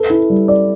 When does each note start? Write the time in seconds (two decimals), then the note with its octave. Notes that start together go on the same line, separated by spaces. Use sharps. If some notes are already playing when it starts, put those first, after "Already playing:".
Already playing: A4 B4
0.10 E4
0.30 G3
0.48 D5